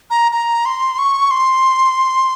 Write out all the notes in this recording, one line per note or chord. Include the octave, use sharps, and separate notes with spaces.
A#5
A#5
C6
C#6
C6